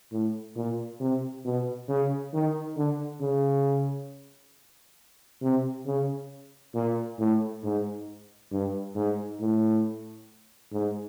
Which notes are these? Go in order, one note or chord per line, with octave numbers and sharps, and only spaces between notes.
A2
A#2
C3
B2
C#3
D#3
D3
C#3
C3
C#3
A#2
A2
G#2
G2
G#2
A2
G#2